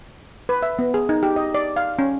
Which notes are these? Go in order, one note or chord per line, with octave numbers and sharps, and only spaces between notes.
B4
E5
B3
G#4
D#4
G4
D#5
D5
F5
C#4